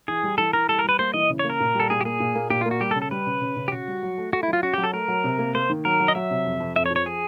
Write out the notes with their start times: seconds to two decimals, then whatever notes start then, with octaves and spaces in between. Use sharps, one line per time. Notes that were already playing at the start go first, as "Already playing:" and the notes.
0.08 E3 G#4
0.23 G3
0.38 E3 A4
0.53 E3 A#4
0.69 G3 A4
0.79 A#4
0.84 G3 B4
0.99 A#3 C5
1.14 E3 D#5
1.30 C#3
1.39 A#3 C#5
1.50 A#4
1.60 A#2
1.75 G3
1.80 A4
1.90 A#2 G#4
2.01 G4
2.05 A#3 G#4
2.20 A#2
2.35 A#3
2.50 A#2 G4
2.61 A#3 F4
2.71 F#4
2.81 G3 G4
2.91 A4
2.96 C#3
3.02 A4
3.11 G3 B4
3.27 C#3
3.41 C#3
3.57 C#3
3.68 G4
3.72 C#3 F#4
3.88 G3
4.03 F#3
4.18 A3
4.33 A3 F#4
4.43 E4
4.48 F#3 F4
4.63 C#4 F#4
4.74 F#3 G4
4.84 A4
4.93 A3 A#4
5.08 F#3
5.24 C3
5.39 A#3
5.55 A#3 C5
5.70 D#3
5.85 F#3 A#4
6.00 F#3
6.08 D#5
6.15 F#3 E5
6.31 C3
6.46 F2
6.60 F2
6.76 F2 E5
6.86 C#5
6.91 F3
6.96 C#5
7.06 G#4